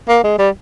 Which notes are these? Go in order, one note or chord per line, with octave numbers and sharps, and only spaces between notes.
A#3
G#3
G3